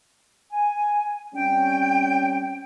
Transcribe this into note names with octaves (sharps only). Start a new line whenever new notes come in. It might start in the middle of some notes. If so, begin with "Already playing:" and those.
G#5
G3 C4 C#4 G5